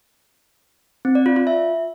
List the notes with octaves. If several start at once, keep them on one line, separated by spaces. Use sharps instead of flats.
C4
D5
F4
F4
E5